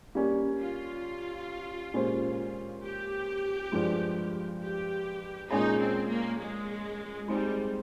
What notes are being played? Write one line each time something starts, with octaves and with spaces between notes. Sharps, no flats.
G3 A#3 C#4 G4
F4
A#2 G#3 C#4 G4 C5
G4
G2 F3 G#3
G4
A#2 G#3 C#4 D#4 G#4 C#5
C4
A#3
G#3
G3 G#3 C4 D#4 G#4